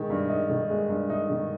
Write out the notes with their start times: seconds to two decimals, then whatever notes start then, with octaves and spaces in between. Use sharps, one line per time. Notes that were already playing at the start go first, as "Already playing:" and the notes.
Already playing: D#3 G#3
0.10 G2
0.29 D#4
0.49 D#3
0.70 G#3
0.90 G2
1.10 D#4
1.30 D#3